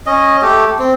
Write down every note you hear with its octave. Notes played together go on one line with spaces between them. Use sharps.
C#4 D#5
A3 G4
C4